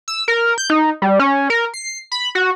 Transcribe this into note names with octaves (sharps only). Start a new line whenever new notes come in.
E6
A#4
G6
D#4
G3
C#4
A#4
C7
B5
F#4